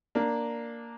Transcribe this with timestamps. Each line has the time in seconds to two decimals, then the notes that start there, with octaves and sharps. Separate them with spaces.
0.15 A#3 D4